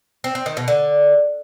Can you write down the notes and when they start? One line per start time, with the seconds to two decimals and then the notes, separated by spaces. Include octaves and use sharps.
0.24 C4
0.35 C4
0.46 D#3
0.57 B2
0.68 D3